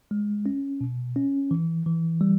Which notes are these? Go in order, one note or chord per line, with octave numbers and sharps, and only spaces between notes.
G#3
C#4
B2
C#4
E3
E3
G3